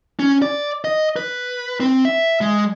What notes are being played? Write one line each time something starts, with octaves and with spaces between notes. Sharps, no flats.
C#4
D5
D#5
B4
C4
E5
G#3